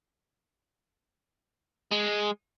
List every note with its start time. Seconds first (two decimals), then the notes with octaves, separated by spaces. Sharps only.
1.92 G#3